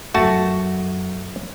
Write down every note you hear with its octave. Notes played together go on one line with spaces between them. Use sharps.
A#1 F#2 A3 F#4 A5